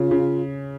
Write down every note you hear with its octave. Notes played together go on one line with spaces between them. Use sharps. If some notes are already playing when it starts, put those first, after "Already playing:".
Already playing: C#3 F4
C#3